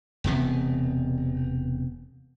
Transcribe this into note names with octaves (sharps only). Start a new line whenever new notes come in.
E1 C3 B3